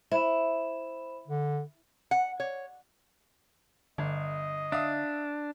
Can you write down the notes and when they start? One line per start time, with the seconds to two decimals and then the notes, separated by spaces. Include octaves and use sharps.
0.11 E4 C5 B5 E7
1.28 D3
2.11 F#5
2.40 C#5
3.98 G1 D3 D#5
4.72 D4 E5 F5 D#6